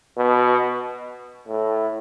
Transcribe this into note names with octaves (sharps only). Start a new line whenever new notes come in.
B2
A2